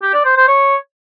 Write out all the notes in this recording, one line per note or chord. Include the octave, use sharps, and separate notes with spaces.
G4
D5
C5
C5
C#5